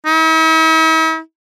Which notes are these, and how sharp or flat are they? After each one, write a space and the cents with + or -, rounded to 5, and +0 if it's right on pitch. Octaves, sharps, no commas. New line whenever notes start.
E4 -45